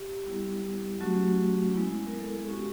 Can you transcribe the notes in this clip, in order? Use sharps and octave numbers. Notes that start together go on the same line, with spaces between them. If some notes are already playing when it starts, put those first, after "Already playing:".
Already playing: G4
G3 B3 E4
F#3 A3 C#4 F#4
G#3 B3 E4
A#4
A4
G#4
G#3 C#4 F#4 G4